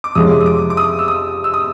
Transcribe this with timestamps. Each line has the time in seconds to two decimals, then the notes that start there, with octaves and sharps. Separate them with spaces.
0.04 D6
0.15 F2 C3 F3 G#3 C#4 D#6
0.41 D#6
0.46 D6
0.70 D6
0.77 D#6
0.99 E6
1.08 D#6
1.44 E6
1.54 D#6